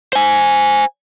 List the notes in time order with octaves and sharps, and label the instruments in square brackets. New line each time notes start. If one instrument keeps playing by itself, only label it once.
[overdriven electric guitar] C5 G#5